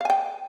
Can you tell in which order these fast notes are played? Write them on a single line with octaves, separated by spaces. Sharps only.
F5 G#5 G5